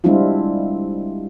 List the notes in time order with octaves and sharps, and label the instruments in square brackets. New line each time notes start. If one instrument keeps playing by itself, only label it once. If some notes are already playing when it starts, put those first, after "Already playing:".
[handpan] G3 G#3 C4 D4 E4 F4